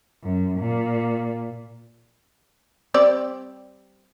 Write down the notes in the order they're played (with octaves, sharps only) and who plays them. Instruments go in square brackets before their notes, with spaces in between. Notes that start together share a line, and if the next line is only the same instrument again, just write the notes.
[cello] F#2
A#2
[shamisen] G3 C4 D5